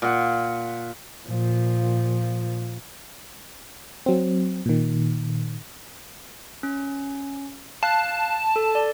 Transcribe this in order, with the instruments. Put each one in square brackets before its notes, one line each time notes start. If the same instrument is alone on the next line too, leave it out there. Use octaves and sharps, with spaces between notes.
[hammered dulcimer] A#2 F#5
[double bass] A#2 F3
[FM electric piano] F#3 C4
A#2 D#3
[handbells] C#4
[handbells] F5 F#6 [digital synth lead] A5
[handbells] A4
D5